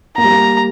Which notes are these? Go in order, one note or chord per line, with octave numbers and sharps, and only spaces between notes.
A#3 A#5
G3
A#3